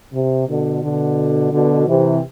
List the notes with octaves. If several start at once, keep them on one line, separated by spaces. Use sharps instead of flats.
C3
B2 D3
B2 D3
B2 D3
C3 E3